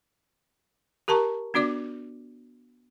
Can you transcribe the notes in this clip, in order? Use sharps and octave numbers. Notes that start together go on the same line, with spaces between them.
G4 A#4 A5 A#5 C#6
B3 D4 F#4 D5 D6